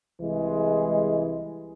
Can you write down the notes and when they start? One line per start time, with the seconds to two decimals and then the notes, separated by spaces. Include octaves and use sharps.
0.21 C2 E3 G#3